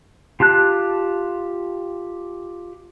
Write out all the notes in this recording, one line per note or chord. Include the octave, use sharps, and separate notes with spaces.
F4 G4 A5 F#6